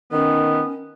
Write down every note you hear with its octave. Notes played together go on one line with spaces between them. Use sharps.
D#3 B3 C#4